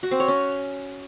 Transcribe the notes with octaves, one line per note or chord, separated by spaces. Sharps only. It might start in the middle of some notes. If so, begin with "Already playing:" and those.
F#4
C4
C#5
C#4